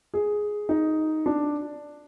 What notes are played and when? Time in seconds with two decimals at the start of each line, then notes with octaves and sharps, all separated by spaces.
0.14 G#4
0.69 D#4
1.26 D4